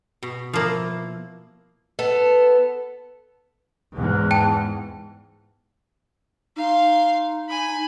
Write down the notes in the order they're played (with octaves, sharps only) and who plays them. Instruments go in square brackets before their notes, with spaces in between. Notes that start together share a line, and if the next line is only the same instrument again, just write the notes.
[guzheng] B2
[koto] F3 A#3 [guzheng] E4 F5
[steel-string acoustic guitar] B3 A4
[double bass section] E2 G#2
[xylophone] G5 A5
[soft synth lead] D#4 [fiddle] F5 C6
[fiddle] G#5 B5